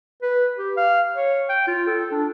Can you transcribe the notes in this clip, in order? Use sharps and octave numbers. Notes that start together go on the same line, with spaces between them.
B4
G4
F5
C#5
G5
F4
A4
D4